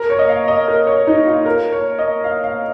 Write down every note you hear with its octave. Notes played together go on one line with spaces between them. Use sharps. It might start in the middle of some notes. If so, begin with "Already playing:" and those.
Already playing: A#4
C#5
D#5
F5
D#5
A#4
C#5
D#4
F4
A#4
C#5
D#5
F5
F5